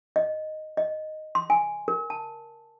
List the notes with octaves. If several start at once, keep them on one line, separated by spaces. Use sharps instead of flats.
D#5
D#5
C6
G#5
A#4
A5